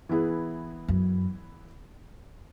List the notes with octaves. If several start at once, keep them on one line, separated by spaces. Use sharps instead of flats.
E3 B3 E4 G#4
F#2